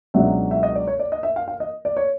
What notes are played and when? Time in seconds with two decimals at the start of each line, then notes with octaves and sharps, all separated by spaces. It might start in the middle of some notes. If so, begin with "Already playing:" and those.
0.14 C#2 B2 F#3 B3 D4 E5
0.51 E5
0.63 D#5
0.75 D5
0.87 C#5
0.99 D5
1.12 D#5
1.23 E5
1.36 F5
1.48 F5
1.60 D#5
1.85 D5
1.97 C#5